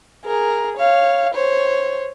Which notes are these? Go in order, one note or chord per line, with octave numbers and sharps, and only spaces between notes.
G#4 A#4
C#5 F5
C5 C#5